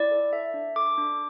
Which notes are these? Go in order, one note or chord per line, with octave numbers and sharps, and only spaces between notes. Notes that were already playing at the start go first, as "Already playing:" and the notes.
Already playing: E4 D5
A4
A4 E5
D4
A4 D6
D4